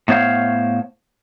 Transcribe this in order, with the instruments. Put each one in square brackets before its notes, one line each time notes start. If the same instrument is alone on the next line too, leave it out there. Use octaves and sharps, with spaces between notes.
[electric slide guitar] A2 B3 C5 C#5 F5